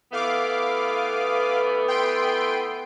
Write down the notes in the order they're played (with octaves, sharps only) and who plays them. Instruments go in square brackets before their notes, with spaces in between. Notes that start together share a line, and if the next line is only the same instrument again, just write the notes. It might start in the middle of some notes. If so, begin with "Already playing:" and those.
[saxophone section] E3 A3 B3 [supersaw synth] F5 D6
[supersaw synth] G5 C6 D7